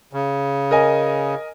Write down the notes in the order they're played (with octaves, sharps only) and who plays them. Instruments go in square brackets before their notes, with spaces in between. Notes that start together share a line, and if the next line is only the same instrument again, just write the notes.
[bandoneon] C#3
[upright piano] A#4 D#5 G#5